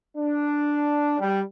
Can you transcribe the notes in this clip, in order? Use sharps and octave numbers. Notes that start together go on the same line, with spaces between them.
D4
G3